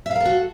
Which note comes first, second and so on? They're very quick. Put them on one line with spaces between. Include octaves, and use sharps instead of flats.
E5 F5 A#4 A4 F#4